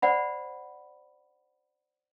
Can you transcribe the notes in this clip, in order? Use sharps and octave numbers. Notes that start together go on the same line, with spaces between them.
C5 D5 F#5 B5